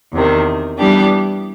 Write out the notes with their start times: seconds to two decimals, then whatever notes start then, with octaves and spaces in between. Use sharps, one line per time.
0.13 E2 C3 D#3
0.78 E3 G3 B3 D4 G4